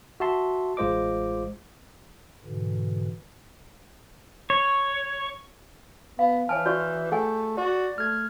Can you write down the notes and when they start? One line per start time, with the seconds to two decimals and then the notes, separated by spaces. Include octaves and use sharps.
0.20 F#4 E5 A5 C6
0.77 A1 G#3 F4 C5 D#5 D6
2.45 G#2 B2 D3 E3
4.50 C#5
6.19 B3 F5
6.49 E3 C#5 G#5 A5 F6
6.66 F#4 D5 C#6 G6
7.12 A3 G#4 F#5 G#5
7.57 F#4 D5
7.98 A3 F6 G#6